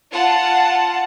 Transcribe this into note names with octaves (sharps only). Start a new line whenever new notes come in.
F4 F#5 A5